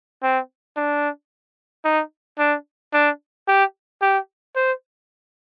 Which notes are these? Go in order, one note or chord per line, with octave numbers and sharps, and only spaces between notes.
C4
D4
D#4
D4
D4
G4
G4
C5